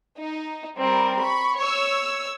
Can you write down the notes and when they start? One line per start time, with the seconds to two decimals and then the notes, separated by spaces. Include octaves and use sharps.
0.18 D#4
0.78 G3 C4 A#4
1.21 B5 C#6
1.58 C#5 E6